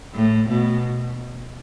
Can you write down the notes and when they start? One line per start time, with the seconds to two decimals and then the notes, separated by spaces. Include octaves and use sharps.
0.14 A2
0.48 B2